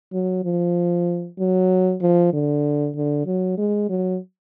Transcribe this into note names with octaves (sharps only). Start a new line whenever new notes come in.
F#3
F3
F#3
F3
D3
D3
F#3
G#3
F#3